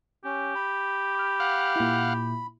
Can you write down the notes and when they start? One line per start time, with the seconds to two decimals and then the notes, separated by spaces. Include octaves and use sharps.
0.25 C#4 G4
0.55 B5
1.15 D6 F6
1.40 F5 F#5
1.76 A#2 E4